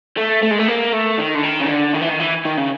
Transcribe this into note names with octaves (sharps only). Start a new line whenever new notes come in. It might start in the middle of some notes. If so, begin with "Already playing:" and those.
A3
A3
G#3
A3
A#3
A3
D#3
D3
D#3
C#3
D3
D#3
E3
D#3
E3
D#3
C#3